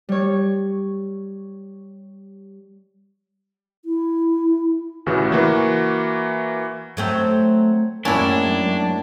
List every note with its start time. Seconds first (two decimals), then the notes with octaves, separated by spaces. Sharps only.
0.09 G3 C#5
3.85 E4
5.06 A1 C#3 E3 F#4
5.32 E3 A#3 F#4
6.97 F#3 A3 C4
8.05 F#2 A2 G#3 A#3 C#4 D4 E4